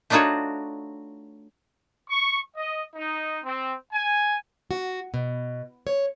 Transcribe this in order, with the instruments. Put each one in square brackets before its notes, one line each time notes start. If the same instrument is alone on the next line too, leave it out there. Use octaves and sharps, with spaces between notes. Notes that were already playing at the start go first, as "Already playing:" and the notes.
[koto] A3 D4 D#4 F4 F#4 C#5
[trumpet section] C#6
D#5
D#4
C4
G#5
[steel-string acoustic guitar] F#4
B2
C#5